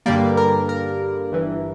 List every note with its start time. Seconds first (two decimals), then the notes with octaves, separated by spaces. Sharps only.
0.06 G2 D3 G3 A#3 D5
0.37 A#4
0.69 A#4
1.32 G1 G2 E3